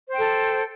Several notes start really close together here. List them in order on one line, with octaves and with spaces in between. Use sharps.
C5 G5 A4